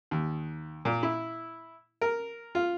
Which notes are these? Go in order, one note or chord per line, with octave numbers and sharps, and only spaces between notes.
D#2
A#2
E4
A#4
F4